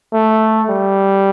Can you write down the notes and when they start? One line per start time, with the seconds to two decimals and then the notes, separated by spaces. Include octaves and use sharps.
0.13 A3
0.69 G3